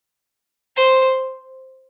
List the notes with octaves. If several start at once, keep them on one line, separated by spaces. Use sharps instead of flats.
C5